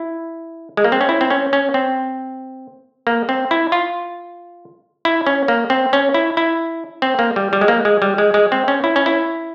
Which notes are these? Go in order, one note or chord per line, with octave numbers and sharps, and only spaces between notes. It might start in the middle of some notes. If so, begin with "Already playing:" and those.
Already playing: E4
G#3
A#3
C4
C#4
E4
C4
C#4
C#4
C4
A#3
C4
E4
F4
E4
C#4
A#3
C4
C#4
E4
E4
C4
A#3
G3
G3
G#3
A#3
G#3
G3
G#3
G#3
C4
C#4
E4
C#4
E4